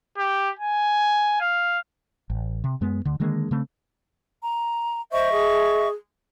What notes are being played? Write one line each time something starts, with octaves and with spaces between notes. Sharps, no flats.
G4
G#5
F5
A1
C3
F#2 G#3 B3
D2 D3
D3 D#3 G#3 A#3
C#3 A3 C4
A#5
C5 D#5 E5 C#6
G#4